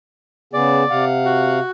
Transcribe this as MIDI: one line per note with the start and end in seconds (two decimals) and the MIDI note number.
0.53 0.84 49
0.53 0.84 59
0.53 0.84 68
0.53 1.05 74
0.90 1.59 48
0.90 1.59 77
0.90 1.59 78
1.25 1.71 66